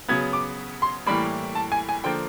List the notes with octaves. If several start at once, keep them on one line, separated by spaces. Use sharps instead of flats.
C#3 F#3 B3 G#6
D6
C6
A2 E3 G3 A#3 B5
A5
G#5
G#5
D3 F3 A#3 G5